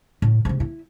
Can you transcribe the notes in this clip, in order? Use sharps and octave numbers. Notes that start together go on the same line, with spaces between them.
A2
G#2 C3
E4